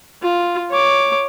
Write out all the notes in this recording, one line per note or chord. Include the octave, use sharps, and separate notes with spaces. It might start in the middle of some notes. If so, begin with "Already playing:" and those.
F4
C#5 D6